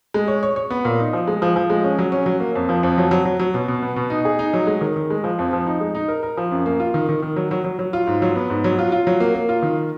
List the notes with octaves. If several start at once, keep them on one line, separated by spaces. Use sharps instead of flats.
G#3
C#5
C#5
C#5
B3
A#2
D#4
F3
G#3
F3
F3
G#3
C#4
F#3
C#4
F#3
A#3
F2
F3
F2
F#3
F#3
F#3
F#3
B2
B2
B3
B2
D#4
G#4
D#4
F#3
G#3
D#3
D#3
G#3
F3
F2
F3
D#4
G#3
D#4
A#4
A#4
F3
F#2
A#3
F4
D#3
D#3
D#3
F#3
F#3
F#3
F#3
F4
G#2
F#3
B3
G#2
F#3
F4
F4
F#3
A#3
A#3
F4
D#3